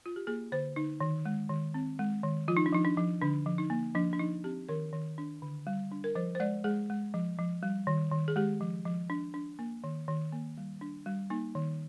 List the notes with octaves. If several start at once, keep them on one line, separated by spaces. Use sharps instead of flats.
F4
G4
A#3 G#4
D3 C5
D3 D#4
D#3
G#3
D#3
C4
G#3
D#3
F3 F4
D#4
D4
F3 D#4
D4
F3
D3 D4
F3
D#4
A#3
F3 D4
D4
F3 D#4
C4 G4
D#3 A#4
D#3
D4
D3
G3
D4
A#4
F3 C5
C5
G#3 D5
G#3 G#4
G#3
F3
F3
G3
D#3
D#3
G#4
G#3 G4
F3
F3
D4
D4
A#3
D#3
D#3
A#3
G3
D4
G3
A#3 D#4
D#3